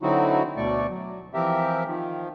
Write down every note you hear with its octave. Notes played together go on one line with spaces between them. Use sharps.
D3 F#3 C4 D#4 E4 F#4
D2 B2 A3 D5 C#6
F#3
E3 F3 C4 G4 A#4 E5
D#3 F3